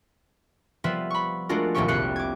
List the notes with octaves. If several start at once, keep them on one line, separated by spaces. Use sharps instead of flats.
F3 G3 B3 F4 B4 E5
B5 C#6
G#3 A3 D4 F4 F#4 A#4
D#1 C2 F3 A#3 G4 C#6
F1 C2 G4 F#6 C7 C#7
D6 G#6